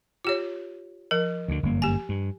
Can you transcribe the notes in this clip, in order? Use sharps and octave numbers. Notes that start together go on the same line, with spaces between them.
F4 G4 C#5
F3 A#4
D2 D3
G1 F#2 A#3
G4 G#5
G2